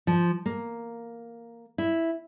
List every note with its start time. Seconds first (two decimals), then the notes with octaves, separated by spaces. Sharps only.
0.07 F3
0.46 A#3
1.78 E4